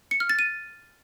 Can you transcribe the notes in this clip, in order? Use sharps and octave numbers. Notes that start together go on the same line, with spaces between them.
C#7
F6
A6
D#7